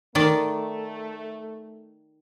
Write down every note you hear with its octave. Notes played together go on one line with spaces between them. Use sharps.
D#3 A3 D5